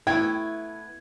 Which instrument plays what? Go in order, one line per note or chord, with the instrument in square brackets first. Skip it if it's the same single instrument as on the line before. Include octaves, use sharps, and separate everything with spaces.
[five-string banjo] A3 B3 G5 [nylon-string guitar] E4 [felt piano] G#6